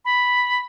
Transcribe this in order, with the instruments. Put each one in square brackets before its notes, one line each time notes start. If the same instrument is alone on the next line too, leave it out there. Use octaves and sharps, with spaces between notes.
[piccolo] B5